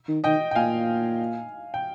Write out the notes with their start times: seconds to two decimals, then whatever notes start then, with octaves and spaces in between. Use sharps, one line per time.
0.08 D#3
0.24 D#3 D#5 G5
0.51 G5
0.55 A#2 F5 G#5
1.74 G5